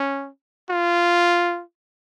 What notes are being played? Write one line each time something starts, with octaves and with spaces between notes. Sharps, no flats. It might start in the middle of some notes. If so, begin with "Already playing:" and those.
Already playing: C#4
F4